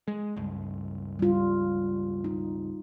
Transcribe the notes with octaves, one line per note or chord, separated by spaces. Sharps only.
G#3
C#2 G2
G3 F4
D#4